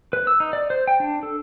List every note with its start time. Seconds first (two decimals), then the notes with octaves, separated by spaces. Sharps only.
0.13 B4
0.27 E6
0.40 D#4
0.53 D5
0.70 C5
0.87 G5
1.00 D4
1.23 A4